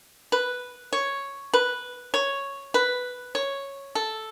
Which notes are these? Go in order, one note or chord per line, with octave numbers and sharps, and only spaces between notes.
B4
C#5
B4
C#5
B4
C#5
A4